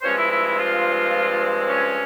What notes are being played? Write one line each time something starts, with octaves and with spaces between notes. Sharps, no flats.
C5
G2 F3 G#3 C4 C#4 C#5
E4 E5
E4 E5
E4 E5
F4 F5
C#4 C#5